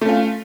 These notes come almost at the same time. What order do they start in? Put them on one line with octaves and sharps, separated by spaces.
A3 C#4 F4